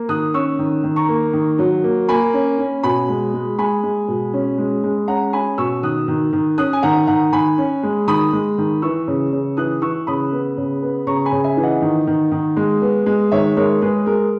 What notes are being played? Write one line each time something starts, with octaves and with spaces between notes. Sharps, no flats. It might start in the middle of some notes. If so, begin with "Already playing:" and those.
Already playing: A#3
D#3 D#6 F#6
C#4 C#6 E6
D#3
D#3
A#5 C#6
A#3
D#3
F#3
A#3
A#3 G#5 B5
C#4
C#4
B2 G#5 B5
G#3
G#3
G#3 G#5 B5
G#3
B2
C#4
G#3
G#3
C#4 F#5 A#5
C#4 G#5 B5
B2 C#6 E6
D#3 D#6 F#6
D#3
D#3
C#4 D#6 F#6
G#5
D#3 F#5 A#5
D#3 F#5 A#5
D#3 G#5 B5
C#4
G#3
D#3 B5 D#6
G#3
D#3
E3 C#6 E6
C#3
C#3
E3 D#6 F#6
E3 C#6 E6
C#3 B5 D#6
B3
C#3
B3
C#3 A#5 C#6
G#5 B5
C#3
E5 G#5
E3
D#5 F#5
D#3
D#3
D#3
G#3
B3
G#3
D#3 C#5 E5
G#3 A#4 C#5
G#3 G#4 B4
G#3 A#4